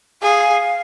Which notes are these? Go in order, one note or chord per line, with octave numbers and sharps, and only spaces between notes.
G#4 F5